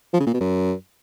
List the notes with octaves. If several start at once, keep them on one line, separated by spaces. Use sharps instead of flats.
F3
C#3
A#2
B2
F#2